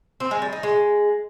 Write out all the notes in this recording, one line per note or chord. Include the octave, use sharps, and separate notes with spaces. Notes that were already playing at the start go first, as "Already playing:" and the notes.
C4
G#3
G3
D#4
G#3